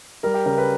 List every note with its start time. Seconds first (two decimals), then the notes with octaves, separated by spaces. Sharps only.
0.23 G3 A#4
0.34 G4
0.46 C#3 A#4
0.58 B4